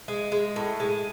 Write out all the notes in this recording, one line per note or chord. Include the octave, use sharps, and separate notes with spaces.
G#3
G#3
A2
G#3